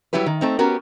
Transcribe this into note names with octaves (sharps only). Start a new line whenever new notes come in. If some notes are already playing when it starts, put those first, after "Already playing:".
F#3 G3 E4 G4 B4
D#3
A3 C4 D#4
B3 C#4 F#4 G4 A#4